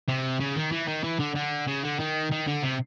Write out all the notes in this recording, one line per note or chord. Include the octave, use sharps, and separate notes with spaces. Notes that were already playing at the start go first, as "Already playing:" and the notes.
C3
C#3
D#3
E3
D#3
E3
D3
D3
C#3
D3
D#3
D#3
D3
C3